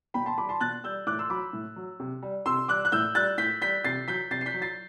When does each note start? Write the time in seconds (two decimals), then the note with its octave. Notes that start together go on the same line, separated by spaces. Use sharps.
0.14 B2 G5 B5
0.26 A5 C6
0.38 G3 B5 D6
0.49 A5 C6
0.61 B2 F#6 A6
0.84 G3 E6 G6
1.07 A2 D6 F#6
1.19 C6 E6
1.30 F#3 B5 D6
1.53 A2
1.76 F#3
2.00 C3
2.23 G3
2.46 C3 C6 E6
2.68 G3 D6 F#6
2.85 F#6
2.92 A2 E6 G6
3.15 G3 F#6 A6
3.38 A2 G6 B6
3.62 G3 G6 B6
3.84 C3 A6 C7
4.08 F#3 G6 B6
4.31 C3 A6 C7
4.41 C7
4.46 G6 B6
4.54 F#3
4.62 A6 C7